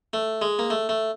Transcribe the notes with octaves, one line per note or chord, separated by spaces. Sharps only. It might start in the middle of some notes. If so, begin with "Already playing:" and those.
A3
G#3
A#3
A3
A3